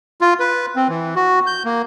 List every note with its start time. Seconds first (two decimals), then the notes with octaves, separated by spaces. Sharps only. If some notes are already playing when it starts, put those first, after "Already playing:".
0.21 F4
0.39 B4
0.76 C4
0.89 E3
1.16 F#4
1.47 G6
1.65 A#3